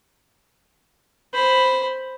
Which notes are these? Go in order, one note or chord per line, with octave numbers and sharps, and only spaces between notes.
C5 B5